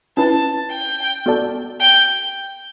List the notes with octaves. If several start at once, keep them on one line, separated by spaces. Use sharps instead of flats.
C#4 E4 B4 A5
G5
B3 F#4 A4 D5 A5
G5